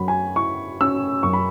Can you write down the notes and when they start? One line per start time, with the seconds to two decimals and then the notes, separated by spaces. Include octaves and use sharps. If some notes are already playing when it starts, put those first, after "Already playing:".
Already playing: F#2 F#3 B5
0.08 G#5
0.36 E4 C#6
0.81 C#4 E6
1.23 F#2 C#6
1.33 B5